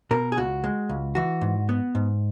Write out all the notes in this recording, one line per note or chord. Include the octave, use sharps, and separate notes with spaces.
B2 A#4
G#4
C#2 F#4
G#3
C#2
E3 F#4
G#2
B3
G#2